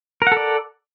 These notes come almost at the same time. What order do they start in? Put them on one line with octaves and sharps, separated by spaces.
A#4 F#5 A4 D5